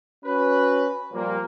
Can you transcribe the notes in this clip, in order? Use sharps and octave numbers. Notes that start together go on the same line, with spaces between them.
C#4 F#4 B4
A#2 F3 G3 A#3